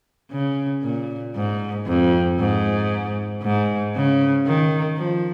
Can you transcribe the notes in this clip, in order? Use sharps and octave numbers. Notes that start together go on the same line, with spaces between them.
C#3
A#2
G#2
F2
G#2
G#2
C#3
D#3
F3